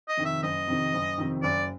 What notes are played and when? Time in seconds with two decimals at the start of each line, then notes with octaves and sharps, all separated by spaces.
0.08 D#5
0.17 F2 C3 D#3
0.25 E5
0.42 F#1 D#5
0.68 F2 C3 D#3
0.93 F#1
1.18 F2 C3 D#3
1.43 F#1 D5